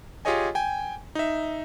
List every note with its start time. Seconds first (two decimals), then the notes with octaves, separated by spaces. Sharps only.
0.25 F4 G4 G#4 C#5 D#5 G#5
0.55 G5 G#5
1.15 D#4 E5